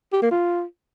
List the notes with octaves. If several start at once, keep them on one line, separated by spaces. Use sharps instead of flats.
G4
A#3
F4